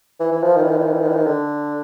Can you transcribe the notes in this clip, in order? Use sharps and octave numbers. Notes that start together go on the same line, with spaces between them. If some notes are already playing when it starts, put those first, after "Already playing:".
E3
E3
F3
D#3
E3
D#3
E3
D#3
E3
D#3
E3
D#3
D3